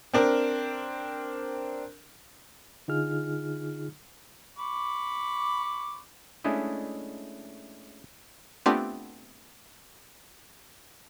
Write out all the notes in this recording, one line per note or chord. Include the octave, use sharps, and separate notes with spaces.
C4 D4 A#4
D3 D#4 F4 G#4 F6
B5 C#6 D6
G#3 A3 C#4 D4 E4 D#5
A3 B3 C4 D4 F4 G4